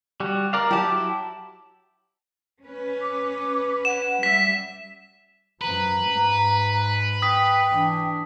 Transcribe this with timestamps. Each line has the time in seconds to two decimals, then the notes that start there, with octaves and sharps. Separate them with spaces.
0.20 G3 F#4
0.53 A#4 D5 F5
0.71 F#3 E4 G4 A5 D6
2.62 C#4 B4
3.01 D6
3.85 F#5 E7
4.23 G3 E5 B6
5.61 F#2 F3 B4 A#5
6.09 G#2
7.22 G5 D#6 B6
7.70 E3 D4